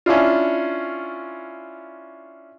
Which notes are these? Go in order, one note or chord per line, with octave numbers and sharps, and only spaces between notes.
C#4 D4 E4 F4